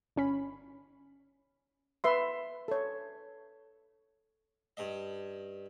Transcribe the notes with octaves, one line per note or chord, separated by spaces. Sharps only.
G1 C#4 B5
B4 E5 C6
A4 C#5
G2 D#5